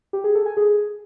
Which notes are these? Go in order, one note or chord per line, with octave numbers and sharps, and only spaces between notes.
G4
G#4
A4
G#5
G#4